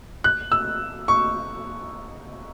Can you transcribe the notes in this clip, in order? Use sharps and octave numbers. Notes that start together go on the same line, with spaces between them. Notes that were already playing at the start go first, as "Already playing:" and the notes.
F#6
E6
C#6